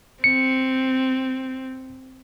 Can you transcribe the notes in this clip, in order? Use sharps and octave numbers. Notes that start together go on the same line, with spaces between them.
C4 C#7